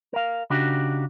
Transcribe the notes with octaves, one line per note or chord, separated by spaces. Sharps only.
A#4 F5
C#3 D4 D#4 F#4 G4